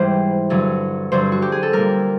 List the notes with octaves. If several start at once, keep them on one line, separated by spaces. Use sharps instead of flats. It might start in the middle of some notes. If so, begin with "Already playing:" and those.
Already playing: G#2 E3 G3 C5
G2 D3 F#3
G2 D3 F#3 C5
F#4
G4
G#4
A4
A#2 G3 A#4